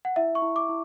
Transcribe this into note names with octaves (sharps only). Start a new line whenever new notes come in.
F#5
E4 E5
C#6
E4
D6
E4